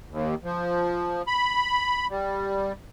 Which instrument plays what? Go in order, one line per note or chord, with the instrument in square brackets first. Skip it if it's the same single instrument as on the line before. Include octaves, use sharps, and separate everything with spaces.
[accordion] D#2
F3
B5
G3